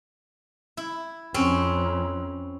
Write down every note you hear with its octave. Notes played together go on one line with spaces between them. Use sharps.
E4
F2 C4 C#4